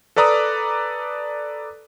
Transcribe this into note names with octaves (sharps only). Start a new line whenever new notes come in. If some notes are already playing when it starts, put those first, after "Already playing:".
A4 B4 D5 A#5 D6 D#6